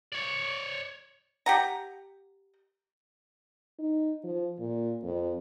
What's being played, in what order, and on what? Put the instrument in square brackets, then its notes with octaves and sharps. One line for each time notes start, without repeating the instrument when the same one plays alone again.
[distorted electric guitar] C#5 D5
[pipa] G4 F#5 A#5
[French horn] D#4
F3
A#2
F2